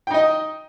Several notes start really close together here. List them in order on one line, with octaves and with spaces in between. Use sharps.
G5 D#4 D#5